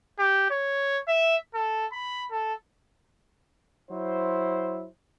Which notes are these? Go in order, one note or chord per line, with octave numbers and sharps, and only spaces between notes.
G4
C#5
E5
A4
B5
A4
F#3 E4 C5